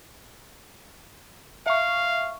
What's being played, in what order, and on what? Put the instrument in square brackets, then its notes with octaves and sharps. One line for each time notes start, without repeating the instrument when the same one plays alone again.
[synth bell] E5 C#6 [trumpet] F5